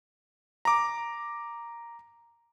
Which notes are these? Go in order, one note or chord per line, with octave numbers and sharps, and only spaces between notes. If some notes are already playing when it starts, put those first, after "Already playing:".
A#5 D6